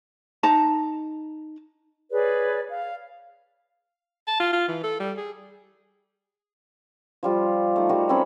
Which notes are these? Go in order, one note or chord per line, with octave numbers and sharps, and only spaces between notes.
D#4 A5 A#5
G#4 B4 C#5 D5
F5
A5
F4
F4
E3
A4
G3
G#4
F3 G3 F4
A3 D#4
G3 F#4 A#4
C4 C#4 A4 B5